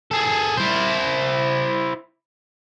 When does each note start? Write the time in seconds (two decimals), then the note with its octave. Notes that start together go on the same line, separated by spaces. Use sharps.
0.11 G#4 A4
0.57 E4 C5